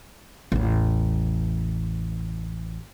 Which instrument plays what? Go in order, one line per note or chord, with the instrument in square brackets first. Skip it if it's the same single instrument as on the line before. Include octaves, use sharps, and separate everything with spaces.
[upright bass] A1 E2